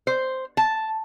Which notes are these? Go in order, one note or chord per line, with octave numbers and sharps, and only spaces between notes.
C5
A5